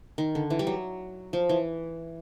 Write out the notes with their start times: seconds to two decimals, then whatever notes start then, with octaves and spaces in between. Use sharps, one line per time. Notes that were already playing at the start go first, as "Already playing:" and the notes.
0.18 D#3
0.35 D3
0.50 E3
0.59 G3
0.67 F#3
1.33 F3
1.49 E3